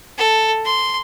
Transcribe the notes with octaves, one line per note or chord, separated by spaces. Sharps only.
A4
C6